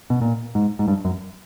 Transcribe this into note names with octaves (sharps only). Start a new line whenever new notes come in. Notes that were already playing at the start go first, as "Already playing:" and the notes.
B2
A#2
G#2
G#2
G2
F#2